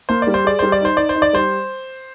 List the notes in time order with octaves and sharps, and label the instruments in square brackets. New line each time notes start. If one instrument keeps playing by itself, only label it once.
[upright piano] A#3 [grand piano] C5
[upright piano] G3 [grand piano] D5
[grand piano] C5
[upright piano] G#4 [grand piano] D5
[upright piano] G3 [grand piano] C5
[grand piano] D5
[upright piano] D#4 [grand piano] C5
[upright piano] D#4 [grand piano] D5
[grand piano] C5
[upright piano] D#4
[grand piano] D5
[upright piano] G3 [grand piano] C5